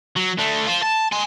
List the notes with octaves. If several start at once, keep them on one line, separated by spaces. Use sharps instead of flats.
F#3
D3 A3
F4 C5
A5
G#5 C6